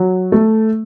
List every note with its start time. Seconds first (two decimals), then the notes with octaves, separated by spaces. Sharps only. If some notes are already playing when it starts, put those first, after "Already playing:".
Already playing: F#3
0.32 A3